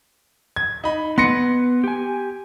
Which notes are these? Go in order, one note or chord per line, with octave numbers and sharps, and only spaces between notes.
G#6
D#4 B5
B3 B4 C6 A#6 C#7
G4 G#5